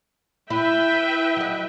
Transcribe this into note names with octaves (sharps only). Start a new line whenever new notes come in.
E4 B4 E5 G5
F#3 D#5